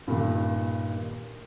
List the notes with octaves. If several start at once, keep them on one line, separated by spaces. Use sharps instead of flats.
G2 A#2 D#3